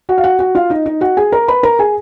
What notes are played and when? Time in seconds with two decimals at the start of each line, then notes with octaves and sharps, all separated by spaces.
0.09 F#4 F#5
0.18 F5
0.24 F#4 F#5
0.39 F#4 F#5
0.55 F4 F5
0.70 D#4 D#5
0.86 D#4 D#5
1.01 F#4 F#5
1.17 G#4 G#5
1.32 A#4 A#5
1.48 B4 B5
1.63 A#4 A#5
1.79 G#4 G#5